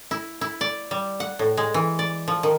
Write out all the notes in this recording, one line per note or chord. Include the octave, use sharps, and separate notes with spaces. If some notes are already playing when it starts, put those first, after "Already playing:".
E4
E4
D5
G3
F#5
A2
G#3
E3
D5
F3
D#3